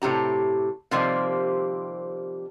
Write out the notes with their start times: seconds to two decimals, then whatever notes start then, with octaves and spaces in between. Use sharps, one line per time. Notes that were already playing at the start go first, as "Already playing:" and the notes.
0.02 A2 C3 G4 A#5
0.91 C3 D#3 F3 G3 A#3 C4